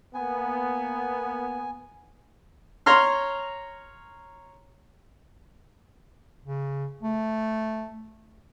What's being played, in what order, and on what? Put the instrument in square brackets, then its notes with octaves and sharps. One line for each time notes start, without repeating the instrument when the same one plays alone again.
[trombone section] A#3 B3 [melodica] G#5
[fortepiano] C#5 A#5 C6 F6
[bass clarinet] C#3
A3